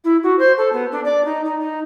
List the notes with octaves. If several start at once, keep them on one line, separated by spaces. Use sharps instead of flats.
E4
F#4
C5
A4
B3
D4
D5
D#4
D#4
D#4